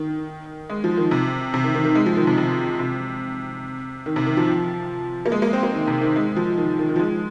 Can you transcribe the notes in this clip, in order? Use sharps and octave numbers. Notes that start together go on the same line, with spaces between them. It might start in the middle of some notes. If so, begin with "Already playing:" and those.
Already playing: D#3
G#3
F3
D#3
C3
C3
D#3
D#3
D#3
G#3
F3
D#3
C3
C3
C3
D#3
C3
D#3
F3
A#3
G#3
A#3
C4
A#3
D#3
C3
D#3
G#3
F3
D#3
D#3
D#3
F3
G#3